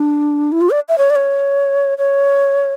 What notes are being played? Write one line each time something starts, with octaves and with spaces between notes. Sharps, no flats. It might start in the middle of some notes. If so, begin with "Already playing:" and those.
Already playing: D4
E4
F4
D5
E5
C#5
D5
C#5
C#5